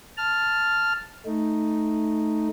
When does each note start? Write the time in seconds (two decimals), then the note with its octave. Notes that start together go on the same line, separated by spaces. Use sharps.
0.18 A5 F6
1.26 A3 D#4